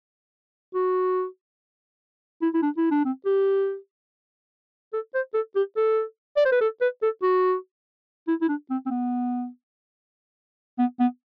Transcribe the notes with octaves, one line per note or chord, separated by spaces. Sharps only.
F#4
E4
E4
D4
E4
D4
C4
G4
A4
C5
A4
G4
A4
D5
C5
B4
A4
B4
A4
F#4
E4
E4
D4
C4
C4
B3
B3
B3